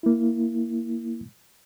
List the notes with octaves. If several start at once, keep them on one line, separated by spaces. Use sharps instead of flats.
A#3 E4